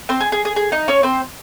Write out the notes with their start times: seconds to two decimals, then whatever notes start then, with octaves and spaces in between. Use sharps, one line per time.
0.09 C4 C5
0.21 G#4
0.32 G#4
0.45 G#4
0.56 G#4
0.72 D#4 D#5
0.88 C#4 C#5
1.03 C4 C5